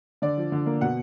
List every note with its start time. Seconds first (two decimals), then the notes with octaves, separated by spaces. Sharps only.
0.22 D3 D5
0.37 F3
0.52 D3
0.66 A#3
0.81 B2 F#5